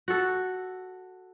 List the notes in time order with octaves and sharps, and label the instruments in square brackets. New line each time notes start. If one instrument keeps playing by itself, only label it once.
[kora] F#4 A4